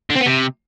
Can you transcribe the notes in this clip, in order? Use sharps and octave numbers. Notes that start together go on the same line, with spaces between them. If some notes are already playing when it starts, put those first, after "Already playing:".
D3
C4
B3
C3